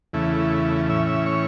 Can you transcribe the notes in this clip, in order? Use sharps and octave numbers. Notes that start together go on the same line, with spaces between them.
E2 C#3 A3 E4
A2 E3 C#4 E5
E5
C#5